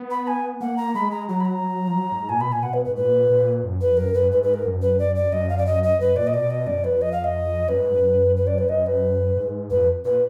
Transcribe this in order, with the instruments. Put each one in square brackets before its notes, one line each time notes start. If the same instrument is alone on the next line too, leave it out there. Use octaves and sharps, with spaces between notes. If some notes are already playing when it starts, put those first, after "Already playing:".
Already playing: [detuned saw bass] B3
[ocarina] B5
G#5
[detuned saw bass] A#3 [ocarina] F#5
[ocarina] A#5
[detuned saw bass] G#3 [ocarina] B5
[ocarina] A#5
[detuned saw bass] F#3 [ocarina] A#5
[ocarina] B5
A#5
[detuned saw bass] F#3
F3
F#3
G#2
[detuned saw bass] A#2 [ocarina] G#5
[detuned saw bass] B2 [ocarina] B5
[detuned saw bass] A#2 [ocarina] G#5
[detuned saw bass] B2 [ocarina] F#5
[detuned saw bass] B2 [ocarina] B4
[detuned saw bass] G#2 [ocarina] B4
[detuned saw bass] A#2 [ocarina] B4
[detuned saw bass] A#2
F#2
[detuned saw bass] F2 [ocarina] B4
[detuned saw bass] F#2 [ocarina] A#4
[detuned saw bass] F#2 [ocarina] B4
[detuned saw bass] G#2 [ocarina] B4
[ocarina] B4
A#4
[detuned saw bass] F#2
[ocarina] B4
D5
D5
[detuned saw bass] F#2 [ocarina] D#5
[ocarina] F5
D5
D#5
D#5
[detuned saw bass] F#2 [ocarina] B4
[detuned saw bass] A#2 [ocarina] D5
[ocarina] D#5
[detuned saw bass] B2 [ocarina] D5
[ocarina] D#5
[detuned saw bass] F#2 [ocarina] D5
[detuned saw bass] F2 [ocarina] B4
[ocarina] D#5
F5
D#5
[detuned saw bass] F#2 [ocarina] B4
[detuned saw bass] G#2
F#2
F#2
[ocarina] B4
D5
B4
[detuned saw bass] F#2 [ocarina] D#5
[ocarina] B4
[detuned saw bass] G#2
[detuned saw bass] F2 [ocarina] B4
[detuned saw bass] A#2 [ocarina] B4